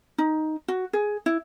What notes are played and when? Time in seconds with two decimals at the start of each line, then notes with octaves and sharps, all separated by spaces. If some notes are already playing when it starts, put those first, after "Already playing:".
0.18 D#4
0.68 F#4
0.93 G#4
1.26 E4